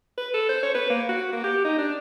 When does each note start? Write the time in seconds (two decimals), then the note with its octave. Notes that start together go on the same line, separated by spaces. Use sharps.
0.17 B4
0.34 A4
0.49 C5
0.63 C#5
0.75 B4
0.90 A#3
1.09 F#4
1.32 A#3
1.44 G4
1.65 D#4
1.78 D4